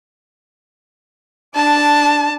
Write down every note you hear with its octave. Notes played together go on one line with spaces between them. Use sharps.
D4 A5